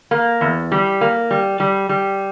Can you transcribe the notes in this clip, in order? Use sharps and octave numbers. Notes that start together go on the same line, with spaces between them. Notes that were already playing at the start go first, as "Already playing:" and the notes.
A#3
E2
G3
A#3
G3
G3
G3